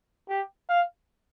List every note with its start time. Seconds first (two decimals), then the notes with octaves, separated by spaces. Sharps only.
0.29 G4
0.69 F5